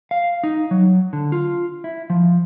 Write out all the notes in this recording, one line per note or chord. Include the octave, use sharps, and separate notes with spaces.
F5
D#4
F#3
D3
F4
E4
F3